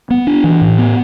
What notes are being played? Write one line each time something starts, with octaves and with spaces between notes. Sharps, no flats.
B3
D4
E3
A2
B3